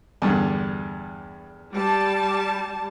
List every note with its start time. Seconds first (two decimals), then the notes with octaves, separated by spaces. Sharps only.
0.22 E2 G2 D3
1.74 G3 A5